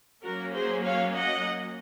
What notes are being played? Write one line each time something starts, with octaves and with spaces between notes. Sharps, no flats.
F#3 A#3 C#4 F#4 A#4
G#4 C5
C#5 F5
D#5 F#5